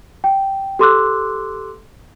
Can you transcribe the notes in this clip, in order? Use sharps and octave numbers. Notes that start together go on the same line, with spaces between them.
G5
G4 A4 C6 D6 E6 F#6